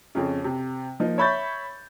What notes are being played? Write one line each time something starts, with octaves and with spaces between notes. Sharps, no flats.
F2 C#3
C3
F3 A#3 D#4
C#5 E5 B5 C#6 G6 A6